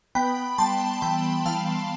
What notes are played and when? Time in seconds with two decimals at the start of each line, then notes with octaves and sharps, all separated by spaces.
0.15 B3 G5 B5
0.58 G3 A5 C6
1.02 E3 G5 B5
1.46 E3 F5 A5